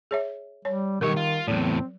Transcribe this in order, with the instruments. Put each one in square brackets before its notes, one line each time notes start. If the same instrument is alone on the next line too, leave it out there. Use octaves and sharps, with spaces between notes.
[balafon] G#4 C#5 E5
[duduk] G3 [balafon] C#5
[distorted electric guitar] B1 C#5 [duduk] D#3 [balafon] G3 G4 A#4
[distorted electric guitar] F4
[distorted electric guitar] E2 A2 [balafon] F#3 [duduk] C4